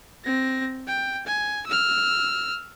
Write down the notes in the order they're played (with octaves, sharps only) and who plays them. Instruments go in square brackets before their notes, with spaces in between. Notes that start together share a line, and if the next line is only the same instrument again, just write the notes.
[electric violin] C4 A#6
G5
G#5
E6 F6